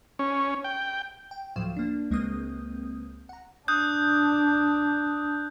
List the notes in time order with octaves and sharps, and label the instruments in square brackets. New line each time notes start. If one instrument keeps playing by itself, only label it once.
[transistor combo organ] C#4
G5
[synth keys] G5
D2 A2 F3 F#3 F5 E7
A#3 D4
C#2 G#3 A#3 C4 D#6 G6
F#5 A#5
[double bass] D4 [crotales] D#6 F#6 G6